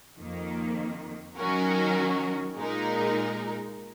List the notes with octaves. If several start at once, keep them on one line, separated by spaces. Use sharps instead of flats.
F2 D#3 A#3
D#3 F#3 C#4 F#4 A#4
A#2 G#3 D#4 A#4